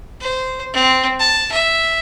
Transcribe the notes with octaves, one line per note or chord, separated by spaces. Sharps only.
C5
C4
A5
E5